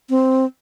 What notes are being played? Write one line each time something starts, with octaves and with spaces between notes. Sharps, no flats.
C4